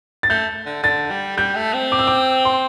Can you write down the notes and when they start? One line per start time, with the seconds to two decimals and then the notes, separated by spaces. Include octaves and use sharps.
0.23 A6
0.30 A3 G6
0.66 D3
0.83 D3 A6
1.11 G3
1.37 G3 G6
1.55 A3
1.74 C4
1.92 D6
1.99 E6
2.07 D6
2.45 C6